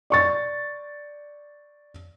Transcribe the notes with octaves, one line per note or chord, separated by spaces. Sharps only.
D5 C#6 A6